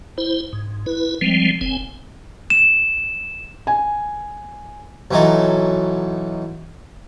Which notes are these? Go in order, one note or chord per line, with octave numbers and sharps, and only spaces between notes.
E4 C5
G#2
E4 B4
F3 G3 G#3 C4
F#1 C4 G#5
E7
G#5
B1 E3 F#3 D#4 A4